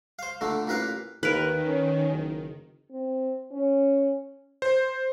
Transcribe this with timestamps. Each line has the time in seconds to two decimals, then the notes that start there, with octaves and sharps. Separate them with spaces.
0.19 C5 F5
0.41 A#2 D3 A3
0.67 A1 A#2 A#4 B4 F5
1.23 D#2 D#3 A#4 B4
1.65 C#4
2.10 F#1
2.92 C4
3.51 C#4
4.62 C5